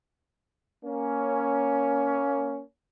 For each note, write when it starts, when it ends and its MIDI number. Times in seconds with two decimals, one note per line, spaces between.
0.84 2.61 58
0.84 2.61 61